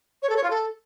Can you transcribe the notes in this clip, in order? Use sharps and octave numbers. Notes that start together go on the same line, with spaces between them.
C#5
A4
C#5
F4
A4